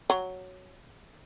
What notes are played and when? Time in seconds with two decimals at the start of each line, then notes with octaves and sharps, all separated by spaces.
0.10 F#3